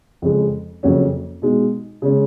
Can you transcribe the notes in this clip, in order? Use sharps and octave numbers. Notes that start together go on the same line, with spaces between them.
F2 C#3 G#3
F2 C#3 F#3 A#3 C#4
B2 G#3 D#4
C#3 G#3 C#4